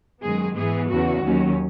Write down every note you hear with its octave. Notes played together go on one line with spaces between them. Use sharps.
F#2 D#3 G#3 B3 G#4
G#2 E3 B3 G#4
E2 C#3 E3 F#4
D#2 D#3 F#3 C#4